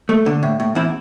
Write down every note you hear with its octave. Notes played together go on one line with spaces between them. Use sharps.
A3
D3
A2
A2
E2 C4 E4